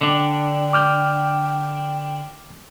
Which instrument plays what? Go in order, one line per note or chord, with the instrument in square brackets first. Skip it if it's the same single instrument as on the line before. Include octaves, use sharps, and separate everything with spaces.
[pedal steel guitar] D3 D4 [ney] G5
[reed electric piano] D6 F6 G6